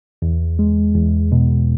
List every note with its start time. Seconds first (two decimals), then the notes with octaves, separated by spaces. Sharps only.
0.22 E2
0.59 G#3
0.95 E2
1.32 B2